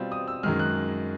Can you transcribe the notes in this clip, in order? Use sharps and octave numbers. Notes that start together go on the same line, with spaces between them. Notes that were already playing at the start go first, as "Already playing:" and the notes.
Already playing: B2 G3 C4 F4
D#6
E6
F#2 D#3 G#3 F6
F#6